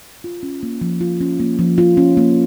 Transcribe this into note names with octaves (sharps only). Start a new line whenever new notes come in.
F4
C#4
A#3
F3
F4
C#4
A#3
F3
F4
C#4
A#3